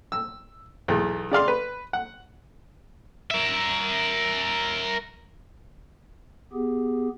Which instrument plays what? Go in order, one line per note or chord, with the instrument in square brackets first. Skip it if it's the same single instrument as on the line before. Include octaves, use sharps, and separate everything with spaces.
[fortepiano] E6
B1 E2
C#3 D5 F5 C6
B4
F#5
[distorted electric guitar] A#4 E5
[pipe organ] B3 G4 G#4